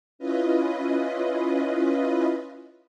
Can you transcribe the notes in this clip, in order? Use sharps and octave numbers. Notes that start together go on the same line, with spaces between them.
C#4 E4 F4 B4 D#5